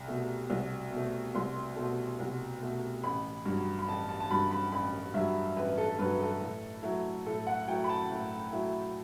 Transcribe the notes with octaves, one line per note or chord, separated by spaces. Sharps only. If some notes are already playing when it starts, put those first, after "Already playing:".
Already playing: C2
B2 A3
C2
B2 A3
C2 C6
B2 A3
C2
B2 A3
A1 B5
G2 F#3
B5
A1 A5
A5
A5
G2 F#3 B5
B5
A1 B5
G2 F#3 E5
A1 B4
A4
G2 F#3 B4
A4
A2
F#3 A3 E4
A2 A4
F#5
F#3 A3 E4 G5
B5
A5
A2
F#3 A3 E4